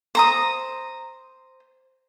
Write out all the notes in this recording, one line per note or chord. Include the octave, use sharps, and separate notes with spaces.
C5 A#5 D#6